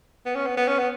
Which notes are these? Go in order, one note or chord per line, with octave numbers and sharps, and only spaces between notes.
B3
C#4
B3
B3
C#4
B3